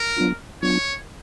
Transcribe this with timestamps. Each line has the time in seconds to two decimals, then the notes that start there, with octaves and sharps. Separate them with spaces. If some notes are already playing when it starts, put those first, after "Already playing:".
Already playing: A#4
0.16 F#3 B3 D4 F4
0.62 F#3 B3 D4 F4 C#5